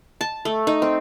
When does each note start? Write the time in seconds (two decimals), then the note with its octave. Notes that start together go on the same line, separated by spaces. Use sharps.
0.21 A5
0.45 A3
0.67 D#4
0.82 C4